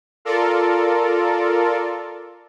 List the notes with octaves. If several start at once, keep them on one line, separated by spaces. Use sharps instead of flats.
F4 A4 A#4 D5